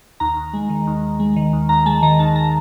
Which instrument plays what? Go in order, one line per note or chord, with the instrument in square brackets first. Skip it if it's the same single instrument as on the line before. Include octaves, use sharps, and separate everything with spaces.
[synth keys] D#2 A#5
D#2
G#3
D#3
D#2
D#2
G#3
D#3
D#2
D#2 A#5
G#3 A5
D#3 A#5
D#2 A5
A#5